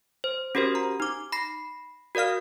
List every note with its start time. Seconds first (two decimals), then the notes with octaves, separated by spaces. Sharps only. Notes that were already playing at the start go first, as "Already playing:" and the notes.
0.24 C5
0.55 C#4 F#4 G4 A#4 C5
0.75 A#5
1.00 D#4 D6
1.32 B5 A#6 C7
2.15 F#4 A#4 D5 F5 F6